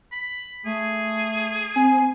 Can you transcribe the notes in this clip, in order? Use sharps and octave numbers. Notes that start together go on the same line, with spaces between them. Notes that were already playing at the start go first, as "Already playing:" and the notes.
B5
A3 G#4
C4 G#5